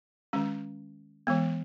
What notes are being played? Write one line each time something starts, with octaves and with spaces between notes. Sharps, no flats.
D#3 G#3 C#4
E3 G#3 B3